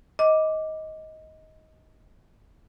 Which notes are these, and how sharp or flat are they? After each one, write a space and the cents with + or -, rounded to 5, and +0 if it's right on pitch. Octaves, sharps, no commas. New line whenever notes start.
D#5 +15 D6 +0